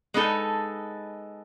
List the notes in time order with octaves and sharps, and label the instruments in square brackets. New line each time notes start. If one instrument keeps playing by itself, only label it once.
[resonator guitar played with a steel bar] G#3 B3 D#4 A4